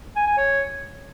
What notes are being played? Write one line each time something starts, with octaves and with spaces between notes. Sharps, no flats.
G#5
G#5
C#5